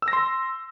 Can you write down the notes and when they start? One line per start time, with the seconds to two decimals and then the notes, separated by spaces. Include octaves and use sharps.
0.02 E6
0.08 A#6
0.13 C6